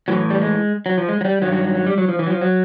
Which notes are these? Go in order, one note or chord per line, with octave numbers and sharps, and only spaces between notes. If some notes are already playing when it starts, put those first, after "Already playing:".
A2 E3 F#3
G3
G#3
F#3
F3
G#3
F#3
G3
G2 D#3 F#3
F#3
F#3
F#3
G3
F#3
F3
E3
F#3
F3
F#3